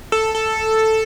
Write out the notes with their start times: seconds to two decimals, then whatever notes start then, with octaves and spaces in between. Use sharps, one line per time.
0.12 A4
0.35 A4